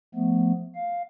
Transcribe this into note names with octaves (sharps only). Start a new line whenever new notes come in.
F3 A3 B3
F5